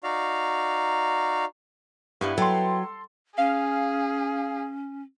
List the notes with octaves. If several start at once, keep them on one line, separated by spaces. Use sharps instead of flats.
D#4 F#4 D5 F5 A#5
G2 G3 B3 E4 B4
F#3 A4 G5 C6
C#4 G#4 F5